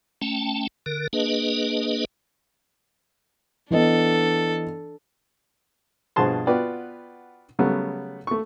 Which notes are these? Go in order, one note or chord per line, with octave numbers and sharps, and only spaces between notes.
A3 C#4 G5 A5
D3 A#4
A#3 D4 G#4 B4 D#5
E3 B3 D4 A4 D#5
G2 B2 F3 G#4 A5 C6
B3 F4 F#4 B4 D5 G5
C#3 F#3 G3 A3 B3
A3 C#6